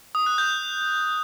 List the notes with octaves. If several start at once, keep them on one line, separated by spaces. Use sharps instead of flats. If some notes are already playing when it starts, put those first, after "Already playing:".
D#6
F#6
G6